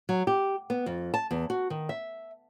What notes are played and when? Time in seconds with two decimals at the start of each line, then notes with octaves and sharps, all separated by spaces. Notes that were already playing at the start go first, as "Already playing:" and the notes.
0.09 F#3
0.27 G4
0.70 B3
0.86 F2
1.14 A5
1.31 E2
1.50 F#4
1.70 D#3
1.89 E5